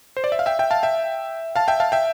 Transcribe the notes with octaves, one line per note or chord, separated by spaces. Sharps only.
C5
D5
E5
F5
E5 G5
E5 G5
F5 A5
E5 G5
F5 A5
E5 G5
F5 A5
E5 G5